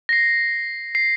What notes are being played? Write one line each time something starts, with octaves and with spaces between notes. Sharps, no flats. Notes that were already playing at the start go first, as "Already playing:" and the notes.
A#6 C7
C7